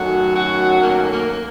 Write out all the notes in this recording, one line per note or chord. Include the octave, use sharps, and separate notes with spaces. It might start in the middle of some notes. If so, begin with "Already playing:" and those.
Already playing: F#2 D#3 F#3 A3 F#4
F#4
A#3
A#3